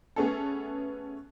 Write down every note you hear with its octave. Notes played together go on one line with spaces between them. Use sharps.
A3 B3 C#4 G#4 A4